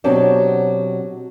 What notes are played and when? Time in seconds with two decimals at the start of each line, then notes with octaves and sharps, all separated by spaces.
0.04 B2 F#3 C4 D4 F#4 G4